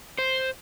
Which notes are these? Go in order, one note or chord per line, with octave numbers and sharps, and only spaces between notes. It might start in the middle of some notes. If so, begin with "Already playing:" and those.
C5